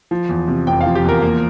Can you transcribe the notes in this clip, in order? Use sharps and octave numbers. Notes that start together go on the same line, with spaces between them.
F3
E2
C3
F1 G5
F5
F3
G4
E2 A#4
A#3